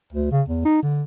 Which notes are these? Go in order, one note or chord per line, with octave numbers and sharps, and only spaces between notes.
D2
C#3
E2
D#4
D3